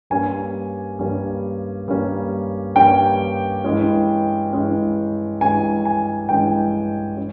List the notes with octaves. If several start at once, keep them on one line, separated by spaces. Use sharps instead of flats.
G2 G3 A#3 C#4 G#5
G2 G3 A#3 C#4
G2 G3 A#3 C#4
G2 G3 A#3 C#4 G5
G2 E3 G#3 C#4
G2 E3 G#3 C#4
G2 E3 G#3 C#4 G#5
G#5
G2 E3 G#3 C#4 G5
C#4